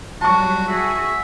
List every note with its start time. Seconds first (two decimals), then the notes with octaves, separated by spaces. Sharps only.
0.21 F#3 G3 F#4 A5 C#6
0.68 F#4 G#4 E5